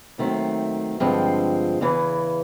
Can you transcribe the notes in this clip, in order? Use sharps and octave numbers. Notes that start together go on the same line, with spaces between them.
D#2 D#3 F#3 A3 C4
G2 D3 F3 G#3 C4
E2 C#3 E3